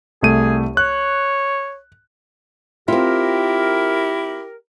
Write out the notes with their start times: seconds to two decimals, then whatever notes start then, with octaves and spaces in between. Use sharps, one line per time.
0.23 C2 A3 G#4 D#7
0.77 C#5 F#6
2.88 C4 E4 F4 G4 A#4